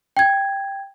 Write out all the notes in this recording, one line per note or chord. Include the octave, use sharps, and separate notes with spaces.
G5 G#6